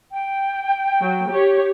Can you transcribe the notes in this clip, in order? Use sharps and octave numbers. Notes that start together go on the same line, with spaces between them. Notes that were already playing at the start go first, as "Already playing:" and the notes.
G5
F#3
G4 C#5